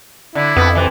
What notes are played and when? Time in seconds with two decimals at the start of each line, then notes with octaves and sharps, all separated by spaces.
0.35 D3 E4
0.56 F2 B3
0.75 C3 E3